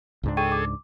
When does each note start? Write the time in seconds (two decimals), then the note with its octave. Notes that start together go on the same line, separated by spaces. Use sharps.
0.23 C#2 G#2 D4
0.37 G#4 A4 G5 C#6 D#7
0.52 D6